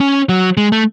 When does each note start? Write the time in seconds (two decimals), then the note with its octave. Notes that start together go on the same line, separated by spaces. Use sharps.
0.01 C#4
0.29 F#3
0.57 G#3
0.72 A3